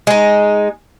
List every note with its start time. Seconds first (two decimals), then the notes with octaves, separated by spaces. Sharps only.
0.07 G#3 D#4